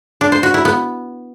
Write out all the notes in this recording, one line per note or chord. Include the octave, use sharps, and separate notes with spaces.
D4
C5
F#4
E4
B3